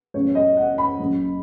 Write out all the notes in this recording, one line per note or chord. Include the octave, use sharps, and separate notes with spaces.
F#2 C#3 B3 C#5
D#5
F#5
B5
F#1 F#2 C#3